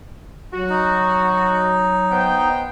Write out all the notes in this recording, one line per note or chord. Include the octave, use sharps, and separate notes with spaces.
F#3 F#4
D#4
B3 C5 G5